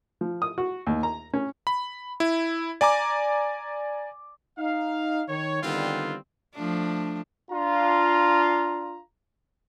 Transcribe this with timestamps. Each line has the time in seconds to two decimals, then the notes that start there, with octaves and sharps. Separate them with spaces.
0.21 F3
0.42 D#6
0.58 F#4
0.87 D#2
1.03 A#5
1.34 C#4
1.67 B5
2.20 E4
2.81 D5 G#5 A#5 D6
4.58 D#4 F5
5.29 D#3 C#5
5.63 D3 D#3 G3 B3 C4 F4
6.54 F3 A3 D4
7.51 D4 F4 A#5